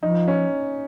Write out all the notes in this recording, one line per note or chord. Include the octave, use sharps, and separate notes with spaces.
F3 D#4
C#4